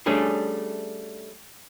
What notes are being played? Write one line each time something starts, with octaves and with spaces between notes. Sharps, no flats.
G3 A3 C#4 D4 G#4